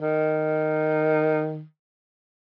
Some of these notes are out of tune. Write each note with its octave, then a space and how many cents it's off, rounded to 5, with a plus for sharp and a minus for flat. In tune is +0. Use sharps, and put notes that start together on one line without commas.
D#3 -5